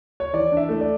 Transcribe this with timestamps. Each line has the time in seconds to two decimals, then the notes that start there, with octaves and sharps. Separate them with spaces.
0.20 C#5
0.33 E3 D5
0.52 D4
0.57 E5
0.69 A3
0.81 D5